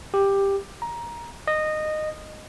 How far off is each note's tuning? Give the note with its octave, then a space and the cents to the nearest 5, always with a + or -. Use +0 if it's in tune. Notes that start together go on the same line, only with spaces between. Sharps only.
G4 +10
A#5 +15
D#5 -15